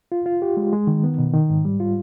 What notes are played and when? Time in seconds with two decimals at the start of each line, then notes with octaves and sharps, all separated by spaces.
0.12 F4
0.26 F4
0.42 G4
0.57 G#3
0.73 G#3
0.87 D#3
1.04 B3
1.18 B2
1.33 D#3
1.50 G#2
1.65 G3
1.80 F4